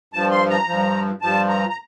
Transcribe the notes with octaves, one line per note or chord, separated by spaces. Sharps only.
G2 F3 A5
C6
A#5
G2 F3
G2 F3 A5
A#5
A#5